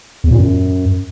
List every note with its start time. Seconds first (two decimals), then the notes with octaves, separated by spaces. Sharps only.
0.24 E2
0.31 A#2
0.38 F#2